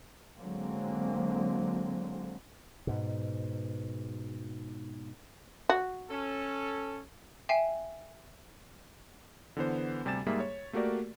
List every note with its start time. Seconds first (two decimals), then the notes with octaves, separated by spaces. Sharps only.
0.40 D3 F#3 G#3 A#3 C4
2.87 G#2 B2
5.69 F#4
6.10 C#4 A4
7.49 E5 G5 G#5 C7 E7
9.57 D3 E3 B3 C5
10.05 D2 C3 G3 G#5 A6 E7
10.26 G#2 G3 A#3 G#4 E5 B6
10.40 C#5
10.73 A3 A#3 F#4 G4 A#4 D5